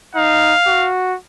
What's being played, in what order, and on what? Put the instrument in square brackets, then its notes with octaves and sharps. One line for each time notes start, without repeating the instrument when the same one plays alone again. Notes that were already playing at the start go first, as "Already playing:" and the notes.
[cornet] D#4 [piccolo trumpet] F5
[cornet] F#4